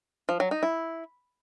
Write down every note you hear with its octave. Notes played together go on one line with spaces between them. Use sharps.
F3
F#3
D#4
E4